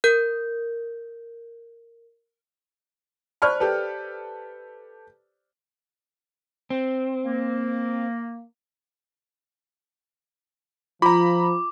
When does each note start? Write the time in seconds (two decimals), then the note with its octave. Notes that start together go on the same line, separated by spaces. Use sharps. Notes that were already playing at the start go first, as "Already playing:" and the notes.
0.04 A#4 G6
3.42 C5 D5 A5 B5 C#6 F6
3.60 G4 A4 B4
6.70 C4
7.25 A#3
11.02 F3 F4 A#5 B5 D6